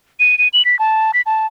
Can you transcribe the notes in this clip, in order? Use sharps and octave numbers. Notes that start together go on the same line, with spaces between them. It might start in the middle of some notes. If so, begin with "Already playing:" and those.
D#7
D#7
F#7
B6
A5
B6
A5